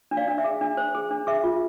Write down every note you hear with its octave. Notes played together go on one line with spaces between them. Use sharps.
D4
D5 F5
D4
E5
G#4
D4
C5
G#4
D4
G#4 E5
F4